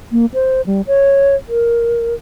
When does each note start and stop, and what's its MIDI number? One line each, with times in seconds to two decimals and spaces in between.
0.12 0.26 58
0.34 0.61 72
0.66 0.82 55
0.87 1.35 73
1.49 2.14 70